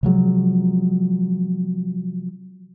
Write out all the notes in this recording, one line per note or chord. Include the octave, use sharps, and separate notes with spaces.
C3 F3 F#3 G#3